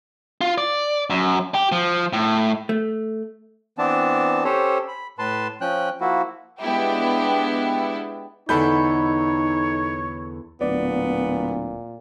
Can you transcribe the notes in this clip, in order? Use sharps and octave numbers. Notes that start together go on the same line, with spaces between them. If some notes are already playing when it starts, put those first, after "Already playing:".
F4
D5
F#2
G4
F3
A2
A3
E3 B3 C4 D4 A5
C#4 G4 A4 C5 C#5
B5
A2 B4 A5 C6
F3 C#4 G5 F#6
F3 A#3 E4 F#4
G#3 B3 D4 E4 G4
E2 D3 D#4 A4 C#5 B5 G6
D1 A#2 B3 D5